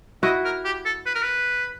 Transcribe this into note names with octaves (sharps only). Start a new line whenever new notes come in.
E4 F#4 D#5
A#4
G4
A4
B4
A#4
B4